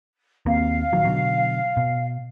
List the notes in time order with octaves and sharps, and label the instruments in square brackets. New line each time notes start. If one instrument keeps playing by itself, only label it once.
[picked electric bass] D#2 A#3 C4 [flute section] F5
[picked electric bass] A#1 D#3 F#3
B2 D3 F#3
B2